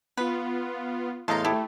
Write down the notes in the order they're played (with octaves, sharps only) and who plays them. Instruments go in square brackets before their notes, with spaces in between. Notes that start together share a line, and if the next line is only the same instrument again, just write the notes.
[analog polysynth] B3 F4 [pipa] B4
[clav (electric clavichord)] E2 A2 D#5 [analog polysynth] F5 C6 A6 [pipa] A5 A#5
[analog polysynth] A3 [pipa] E4 G4 A4